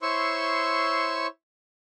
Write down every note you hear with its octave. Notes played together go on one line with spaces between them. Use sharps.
E4 C5 C#5 C6 C#6 E6